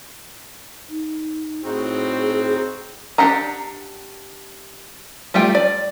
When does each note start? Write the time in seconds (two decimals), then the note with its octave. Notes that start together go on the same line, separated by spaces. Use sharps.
0.89 D#4
1.64 A2 C4 D#4 F#4 G#4
3.18 D4 G4 F#5 A#5
5.34 G3 A3 F4 G5
5.55 D5